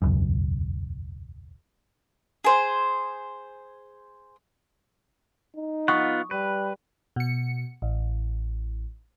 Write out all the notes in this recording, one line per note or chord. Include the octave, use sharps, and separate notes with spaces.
E1 C#2 F#2
G#4 C5
D#4
B3 F4 F#5 C#6 D#6
G3 B4
B2 C#7
A1